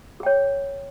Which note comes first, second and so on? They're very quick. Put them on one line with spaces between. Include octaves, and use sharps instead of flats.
G#4 G5 C#5